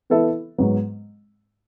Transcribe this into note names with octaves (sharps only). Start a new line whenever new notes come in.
E3 B3 E4 A4 E5
G#2 F#3 B3